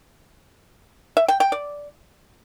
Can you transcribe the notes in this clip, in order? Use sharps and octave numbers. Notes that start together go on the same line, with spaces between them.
E5
G5
G5
D5